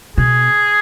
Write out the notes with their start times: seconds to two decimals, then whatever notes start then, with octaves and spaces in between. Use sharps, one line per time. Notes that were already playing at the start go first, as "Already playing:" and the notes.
0.17 B2 G#4